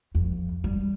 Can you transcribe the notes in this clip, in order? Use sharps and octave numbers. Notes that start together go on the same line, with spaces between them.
F2
G3